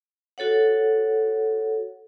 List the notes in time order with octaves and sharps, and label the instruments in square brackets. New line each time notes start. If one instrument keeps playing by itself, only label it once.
[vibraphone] F#4 A4 C#5 F#5